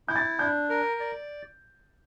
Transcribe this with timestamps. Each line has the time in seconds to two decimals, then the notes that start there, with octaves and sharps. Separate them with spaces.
0.08 E4 G6
0.16 A6
0.39 D4 G6
0.70 A#4
1.00 D5